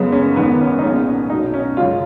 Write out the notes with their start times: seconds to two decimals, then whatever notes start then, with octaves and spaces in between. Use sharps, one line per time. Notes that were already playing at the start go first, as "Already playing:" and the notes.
Already playing: F#1 F#2 C#3 G#3 B3
0.12 C#4
0.36 G#1 G#2 D#3 G#3 B3
0.60 C#4
0.79 D#4
0.83 B1 A#2 G#3 B3 C#4
1.07 C#4
1.30 B1 B2 F#3 D#4
1.54 C#4
1.77 F#2 C#3 G#3 F4